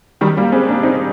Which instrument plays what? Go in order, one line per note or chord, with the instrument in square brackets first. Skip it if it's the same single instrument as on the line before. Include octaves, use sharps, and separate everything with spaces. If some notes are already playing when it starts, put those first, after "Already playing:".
[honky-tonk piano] D#3 G3
G3 A#3
G#3 C4
A#3 D4
C4 D#4